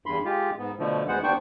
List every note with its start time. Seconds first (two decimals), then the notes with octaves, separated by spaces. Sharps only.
0.06 E2 G2 B5 C6
0.25 G#3 F4 G4
0.58 G#2 B3
0.79 B2 D3 F3 A3
1.08 D2 G#3 B3 C5 F#5
1.23 D#2 B3 D4 C5 G5 C#6